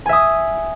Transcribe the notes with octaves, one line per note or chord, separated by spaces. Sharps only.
E5 G#5 D#6